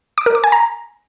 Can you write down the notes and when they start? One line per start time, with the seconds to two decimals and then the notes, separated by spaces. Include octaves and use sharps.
0.18 D6
0.26 A#4
0.35 D6
0.44 G#5
0.52 A#5